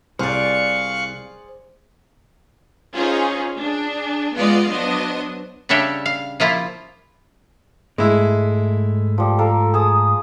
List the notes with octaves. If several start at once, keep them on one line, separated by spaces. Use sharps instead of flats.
C2 G#4 C5 D5 F5 C#6 F#6
C#4 D#4 F4 G#4 C5
D4 G#4
G#3 B3 F4 D5 D#5 F5
F#3 B3 D4 C5 D#5
C#3 G3 D4 C#5 E5 G5
F5
F3 A#3 E4 F4
G#2 G#3 A3 E4
F3 G3
A4 A#4 F5
G#4 A5 D#6